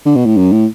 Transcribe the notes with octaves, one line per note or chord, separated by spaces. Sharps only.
D3
B2
A2
F#2
A2